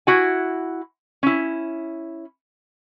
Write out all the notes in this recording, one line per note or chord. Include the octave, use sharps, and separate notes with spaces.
E4 F#4 G#5
C#4 E4